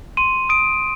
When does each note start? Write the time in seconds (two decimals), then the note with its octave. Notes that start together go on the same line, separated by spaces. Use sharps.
0.17 C6 D#7
0.49 D#6 D7